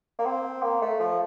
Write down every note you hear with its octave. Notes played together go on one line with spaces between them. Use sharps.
A#3
C4
A#3
A3
F3